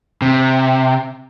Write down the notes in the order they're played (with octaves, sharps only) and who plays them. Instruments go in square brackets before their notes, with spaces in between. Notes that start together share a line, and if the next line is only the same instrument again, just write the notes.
[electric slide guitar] C3